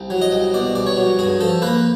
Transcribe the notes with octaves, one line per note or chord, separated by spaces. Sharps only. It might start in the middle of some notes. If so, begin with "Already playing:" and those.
Already playing: C2
F#3
D#5
C2
B2 D5
C2 D5
C#5
F#3
G2 G#4
F3 A4
A#3 B4